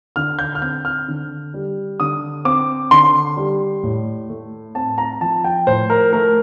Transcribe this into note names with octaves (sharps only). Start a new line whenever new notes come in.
D3 F6
G6
F6
C4 G6
F6
D3
G3
D3 D#6
C4 D6
D3 C6
G3
A2
A3
C4 A5
A#5
F3 A5
G5
A2 C5
A#4
A3 A#4